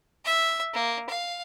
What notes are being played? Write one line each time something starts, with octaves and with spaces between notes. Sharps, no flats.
E5
A#3
F5